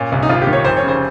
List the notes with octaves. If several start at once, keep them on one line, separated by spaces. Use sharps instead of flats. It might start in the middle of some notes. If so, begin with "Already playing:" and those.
Already playing: A#2 C#4
C2
D#4
G#1 F4
G4
D#3
C#5
F1 C5
C#5
C#3
C5